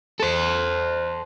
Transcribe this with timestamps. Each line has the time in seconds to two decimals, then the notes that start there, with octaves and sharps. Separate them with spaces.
0.20 A4 C5